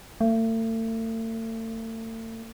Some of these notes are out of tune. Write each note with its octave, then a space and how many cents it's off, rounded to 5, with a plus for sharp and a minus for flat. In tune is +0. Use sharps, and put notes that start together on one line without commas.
A3 +40